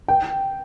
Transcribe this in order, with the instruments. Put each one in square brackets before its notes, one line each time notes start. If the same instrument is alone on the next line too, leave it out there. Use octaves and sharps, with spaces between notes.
[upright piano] G5